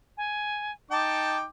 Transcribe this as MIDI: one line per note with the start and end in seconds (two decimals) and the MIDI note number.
0.17 0.71 80
0.91 1.45 63
0.91 1.45 79
0.91 1.36 81
0.91 1.45 86